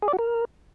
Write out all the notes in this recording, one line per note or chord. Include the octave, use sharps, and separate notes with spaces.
G#4
D5
F#4
A#4